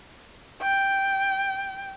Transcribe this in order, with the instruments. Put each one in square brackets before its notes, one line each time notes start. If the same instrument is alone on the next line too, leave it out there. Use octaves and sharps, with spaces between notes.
[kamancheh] G5